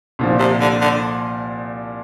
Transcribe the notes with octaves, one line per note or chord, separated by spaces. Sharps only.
C2 A#2 F3
C3
D3
D3